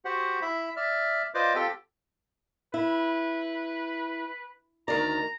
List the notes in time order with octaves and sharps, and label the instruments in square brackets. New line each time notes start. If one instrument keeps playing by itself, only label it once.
[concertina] F#4 G4 C5 F#5
E4 E5 B5
D5 E5 F6
F4 B4 C5 D5 D#5 D6
C4 F4 G4 A4 G5
[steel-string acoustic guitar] E4 [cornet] B4
[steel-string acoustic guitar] D2 D#3 D5 [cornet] A#5